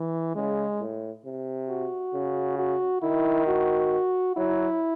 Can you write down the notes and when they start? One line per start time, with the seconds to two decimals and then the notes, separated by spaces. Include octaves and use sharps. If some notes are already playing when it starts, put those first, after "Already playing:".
Already playing: E3
0.35 C#3 G#3
0.80 A2
1.25 C3
1.70 F#4
2.14 C#3
2.59 F#4
3.02 D#3 E4
3.47 F#4
4.37 F#3 E4